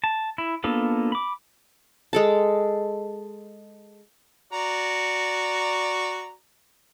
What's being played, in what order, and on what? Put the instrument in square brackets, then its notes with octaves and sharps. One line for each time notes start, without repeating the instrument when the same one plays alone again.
[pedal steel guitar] A5
E4
A#3 B3 D4 F4 A4
B5 D6
[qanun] G#3 A4 A5
[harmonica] F#4 D5 A#5